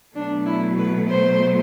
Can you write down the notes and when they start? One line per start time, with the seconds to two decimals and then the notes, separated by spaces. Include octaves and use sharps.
0.15 B2 F#3 A3 D4
0.45 E4
0.78 B4
1.08 C5